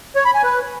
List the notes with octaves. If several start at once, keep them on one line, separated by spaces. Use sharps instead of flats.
C#5
B5
G#5
B4